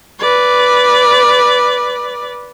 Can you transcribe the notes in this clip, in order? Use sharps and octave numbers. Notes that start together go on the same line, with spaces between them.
B4 D5